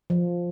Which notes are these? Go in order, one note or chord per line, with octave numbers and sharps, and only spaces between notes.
F3